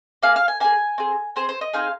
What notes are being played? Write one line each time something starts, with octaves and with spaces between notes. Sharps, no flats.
A#3 G#4 F5
F5
G#5
A#3 G#4 G#5
C4 G#4
C4 G#4 C5
C5
D#5
C4 D#4 G#4 F5